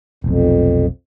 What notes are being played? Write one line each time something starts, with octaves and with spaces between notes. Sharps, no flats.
F1 B1 F2